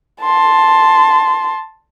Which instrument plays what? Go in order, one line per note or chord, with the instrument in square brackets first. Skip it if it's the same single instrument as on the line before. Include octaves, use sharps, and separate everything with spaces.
[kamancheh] A5 C6